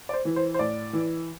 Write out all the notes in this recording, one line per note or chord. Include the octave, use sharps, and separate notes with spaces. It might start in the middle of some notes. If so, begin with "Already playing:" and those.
D5
C5
E3
C5
C5
A2 D5
E3